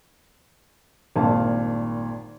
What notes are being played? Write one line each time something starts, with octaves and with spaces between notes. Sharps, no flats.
G#1 G2 A#2 F5 A5